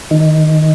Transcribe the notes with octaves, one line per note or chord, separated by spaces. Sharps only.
D#3